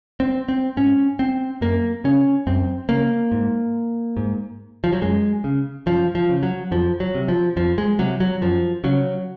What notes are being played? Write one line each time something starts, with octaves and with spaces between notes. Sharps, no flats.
C4
C4
G#2 C#4
C4
F#2 A#3
C#3 C#4
F#2 C4
C#3 A#3
G#2
G#2
F3
F#3
F#2 G#3
C#3
F#2 F3
F3
C#3
F#3
F2 F3
F#3
C3
F3
F2 F3
G#3
C3 F#3
F#3
F#2 F3
C#3 F#3